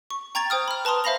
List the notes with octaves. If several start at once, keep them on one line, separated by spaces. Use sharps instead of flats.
C#6
G5 A#5 C#6 G#6 A6 F7
C5 G5 D#6 F6
B5 F6
B4 A5 A#5 C6 D#6
C5 E5 F5 B5 A#6 F7